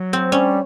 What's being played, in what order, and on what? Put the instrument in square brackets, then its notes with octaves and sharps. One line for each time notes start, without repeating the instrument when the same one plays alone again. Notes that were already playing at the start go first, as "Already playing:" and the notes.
Already playing: [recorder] F#3
[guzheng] C4
[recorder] G3 [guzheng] C#4